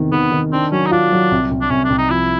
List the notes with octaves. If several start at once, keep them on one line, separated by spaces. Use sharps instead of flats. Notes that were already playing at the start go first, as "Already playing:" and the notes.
Already playing: E2 C3 D#3
D#3 B3
D#3
C4 D4
F#3 C#4
D#4
D4 F4
F#3
C2
C2
D4
C2 C#4
D4
C2
D#4
F3 E4